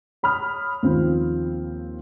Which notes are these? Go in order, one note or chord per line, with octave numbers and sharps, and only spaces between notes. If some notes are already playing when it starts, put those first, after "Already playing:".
C#5 B5 D#6 F6
D#2 F3 C4